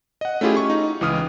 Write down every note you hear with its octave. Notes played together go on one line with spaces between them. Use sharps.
D#5 F#5
A3 C#4 E4 F4 G4 G#4
C#6
D#4
C#2 E3 D#6 F6